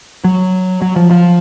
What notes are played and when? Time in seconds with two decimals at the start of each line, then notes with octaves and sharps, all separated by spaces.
0.24 F#3
0.82 F#3
0.96 F3
1.11 F3